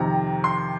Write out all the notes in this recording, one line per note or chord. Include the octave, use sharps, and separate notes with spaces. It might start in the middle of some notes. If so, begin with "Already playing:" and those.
Already playing: F2 C3 D#3 A#5
C6